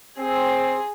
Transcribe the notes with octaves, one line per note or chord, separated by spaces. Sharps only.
C4 G#4